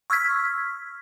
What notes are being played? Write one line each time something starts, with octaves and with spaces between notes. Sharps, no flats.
C#6 E6 F6 G#6 B6